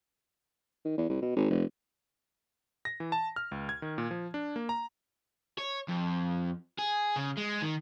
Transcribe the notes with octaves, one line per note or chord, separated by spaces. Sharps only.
D#3
E2
C2
B2
G#1
F1
A#6
E3
A5
F6
C#2
G#6
D#3
A#2
F3
D4
A#3
A#5
C#5
F2
G#4
C#3
G#3
D#3